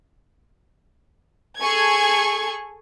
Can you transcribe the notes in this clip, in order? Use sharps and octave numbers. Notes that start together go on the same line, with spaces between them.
G#4 A4 G#5 C#6 G#6